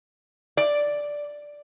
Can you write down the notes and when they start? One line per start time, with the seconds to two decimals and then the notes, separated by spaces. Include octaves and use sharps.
0.57 D5